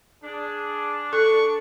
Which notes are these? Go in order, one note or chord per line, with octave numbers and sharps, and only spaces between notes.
D4 G#4
A4 C#6